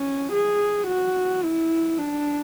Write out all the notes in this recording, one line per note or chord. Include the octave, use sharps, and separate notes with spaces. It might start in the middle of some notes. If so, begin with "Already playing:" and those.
Already playing: C#4
G#4
F#4
E4
D4